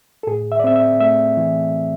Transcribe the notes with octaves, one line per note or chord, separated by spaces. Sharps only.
A4
A2 G#4
E5
D5
C4 E5
E5
A3 E5
E3